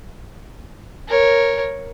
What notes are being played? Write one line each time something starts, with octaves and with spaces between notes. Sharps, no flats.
A#4 C#5